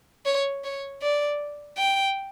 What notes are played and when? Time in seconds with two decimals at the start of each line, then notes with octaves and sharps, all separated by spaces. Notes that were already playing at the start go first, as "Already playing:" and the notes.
0.25 C#5
0.64 C#5
1.02 D5
1.78 G5